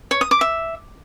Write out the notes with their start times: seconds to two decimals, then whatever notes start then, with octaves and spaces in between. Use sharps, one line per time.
0.11 C#5
0.21 D#6
0.31 D6
0.41 E5